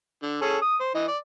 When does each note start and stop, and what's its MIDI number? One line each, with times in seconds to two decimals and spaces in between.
0.23 0.39 50
0.41 0.57 61
0.41 0.57 68
0.41 0.57 69
0.62 0.76 87
0.80 0.90 72
0.95 1.06 52
0.95 1.06 75
1.08 1.17 74